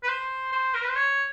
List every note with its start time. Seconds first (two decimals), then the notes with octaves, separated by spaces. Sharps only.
0.03 B4
0.09 C5
0.52 C5
0.74 A#4
0.82 B4
0.89 C5
0.96 C#5